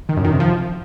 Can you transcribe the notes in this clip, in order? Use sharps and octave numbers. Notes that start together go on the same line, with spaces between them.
D#3
F#2
D#3
C3
F3